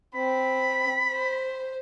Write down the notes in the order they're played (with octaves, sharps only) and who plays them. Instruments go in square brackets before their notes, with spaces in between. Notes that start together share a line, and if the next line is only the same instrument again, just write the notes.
[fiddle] C4 [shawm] B5
[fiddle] C5